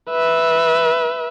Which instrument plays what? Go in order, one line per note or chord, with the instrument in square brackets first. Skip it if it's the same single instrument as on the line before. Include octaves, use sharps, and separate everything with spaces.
[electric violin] B4 E5